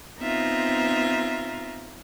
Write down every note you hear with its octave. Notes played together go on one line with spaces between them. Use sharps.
B3 C4 D#4 F4 E5 A#5